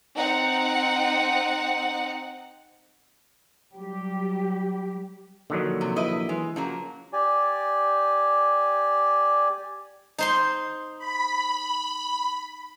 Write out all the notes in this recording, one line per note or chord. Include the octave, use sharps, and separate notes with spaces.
C4 D#4 F#5
F#3 G3 G4
A#1 D3 D#3 F#3
C3
E4 B4 D#5
E3 G#3
C#3 F3 F#3 A#3
G4 D5 G#5
D#4 C5 C6
B5